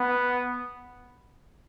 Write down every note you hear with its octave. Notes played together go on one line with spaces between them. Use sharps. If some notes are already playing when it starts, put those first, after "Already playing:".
Already playing: B3